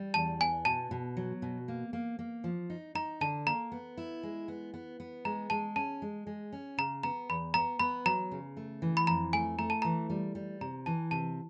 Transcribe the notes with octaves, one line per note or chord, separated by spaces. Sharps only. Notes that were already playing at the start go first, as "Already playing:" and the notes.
Already playing: G3
E2 A5
B3 G#5
B2 A5
B2
F#3
B2
A#3
A#3
A#3
F3
D#4
D#4 A#5
D3 A5
A#3 A#5
B3
E4
G#3
B3
B3
B3
G#3 A#5
G#3 A5
C#4 A5
G#3
G#3
C#4
C#3 A#5
B3 A#5
E2 B5
B3 A#5
B3 B5
F#3 A#5
C#3
A3
E3
B5
F2 A#5
A3 G#5
A3 A#5
A5
E3 A#5
G3
G3
C3 A#5
E3 A5
C3 A5